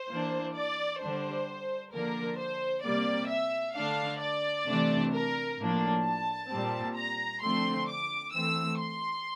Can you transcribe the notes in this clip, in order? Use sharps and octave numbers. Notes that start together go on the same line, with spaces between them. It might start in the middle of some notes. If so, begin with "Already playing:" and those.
Already playing: C5
E3 A#3 D4
D5
D3 G3 D4 C5
D3 F3 A#3 D4 A#4
C5
C3 G3 A#3 D5
E5
D3 A3 D4 F5
D5
C3 E3 A3 D4
A#4
A2 F3 A#3 D4
A5
A#2 G3 C4
A#5
D3 F3 A3 C4 C6
D6
E3 A3 C4 E6
C6